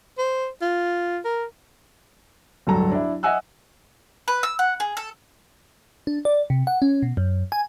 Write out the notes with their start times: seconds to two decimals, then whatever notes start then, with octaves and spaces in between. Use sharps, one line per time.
0.18 C5
0.62 F4
1.25 A#4
2.67 D1 G2 F#3 A4 A#5
2.92 D4 E4
3.23 D#5 E5 F#5 G#5 E6 F#6
4.28 B4
4.43 E6
4.59 F#5
4.80 G#4
4.97 A4
6.07 D4
6.25 D5
6.50 C3
6.67 F#5
6.82 C#4
7.03 B2
7.17 F#2
7.52 G#5